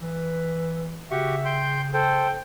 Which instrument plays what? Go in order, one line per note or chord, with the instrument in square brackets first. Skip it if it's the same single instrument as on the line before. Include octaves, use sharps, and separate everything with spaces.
[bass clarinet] E3 [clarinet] B4
[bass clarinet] C#3 [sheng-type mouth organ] F#4 G4 C#6 [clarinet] E5
[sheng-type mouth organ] G5 C6 G6
[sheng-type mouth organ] A4 C5 [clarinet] G5